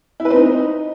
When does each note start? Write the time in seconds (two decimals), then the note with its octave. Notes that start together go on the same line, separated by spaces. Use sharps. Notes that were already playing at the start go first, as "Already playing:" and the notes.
0.20 E4
0.25 B4
0.30 C4
0.36 D#4